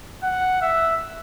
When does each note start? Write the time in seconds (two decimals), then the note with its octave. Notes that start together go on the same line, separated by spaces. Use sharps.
0.23 F#5
0.62 E5